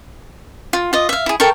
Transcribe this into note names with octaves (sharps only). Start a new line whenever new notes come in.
F4
F4 D#5
E5 F5
E4 G#4
A4 A#4 G5 C#6